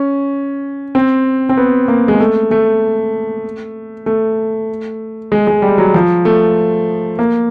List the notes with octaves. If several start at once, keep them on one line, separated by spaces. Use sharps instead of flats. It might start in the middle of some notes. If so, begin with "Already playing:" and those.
Already playing: C#4
C4
C4
B3
A#3
G#3
A3
A3
A3
G#3
G#3
G3
F#3
F3
A3
A#3